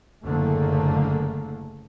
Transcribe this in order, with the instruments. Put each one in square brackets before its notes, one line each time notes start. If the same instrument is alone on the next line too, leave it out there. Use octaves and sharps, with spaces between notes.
[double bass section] F#1 A2 D3 A3 A#3